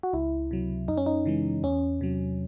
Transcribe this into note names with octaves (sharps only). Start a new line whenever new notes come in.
F#4
C#2 E4
C3 F#3
F#2 D#4
C#4
D#4
C#3 E3 G#3
E2 C#4
C3 F#3